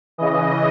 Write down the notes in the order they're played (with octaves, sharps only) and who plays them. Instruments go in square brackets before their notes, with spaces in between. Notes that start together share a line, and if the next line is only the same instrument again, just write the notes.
[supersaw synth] C#3 E3 D#5